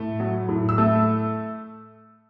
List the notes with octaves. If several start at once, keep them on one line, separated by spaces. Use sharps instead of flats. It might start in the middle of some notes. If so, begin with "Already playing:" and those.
Already playing: A2 A3
F#3
A2
E6
A3